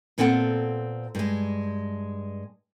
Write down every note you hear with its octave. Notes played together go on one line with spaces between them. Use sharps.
A#2 B3 C4 A4 F#5 G5
G2 G#3